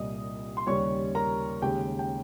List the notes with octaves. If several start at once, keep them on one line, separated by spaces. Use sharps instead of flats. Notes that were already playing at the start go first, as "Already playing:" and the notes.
Already playing: C2 A#2 G3 D#5 D#6
C6
D#2 C#3 G3 C#5 C#6
A#4 A#5
D#2 C#3 G#3 G4 G5
G5